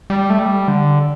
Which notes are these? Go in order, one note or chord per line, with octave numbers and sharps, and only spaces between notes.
G3
A3
G3
D3